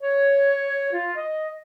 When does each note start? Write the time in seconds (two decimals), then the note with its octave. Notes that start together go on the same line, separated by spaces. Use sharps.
0.02 C#5
0.93 F4
1.16 D#5